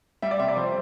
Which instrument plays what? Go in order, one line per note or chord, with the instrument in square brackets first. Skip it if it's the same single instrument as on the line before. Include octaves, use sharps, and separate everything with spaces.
[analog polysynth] G3 [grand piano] E5
[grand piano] D5
[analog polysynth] C3 [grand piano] E5
[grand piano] D5
[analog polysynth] F2 [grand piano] C5